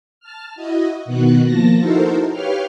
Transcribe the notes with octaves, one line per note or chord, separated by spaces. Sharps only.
A5 F6
E4 F#4 D#5
B2 D#3 B3 F#4 F#6
F3 A#3 A5 A#6
D#4 E4 F#4 A4 A#4 C5
G4 B4 C#5 F5 G5 F6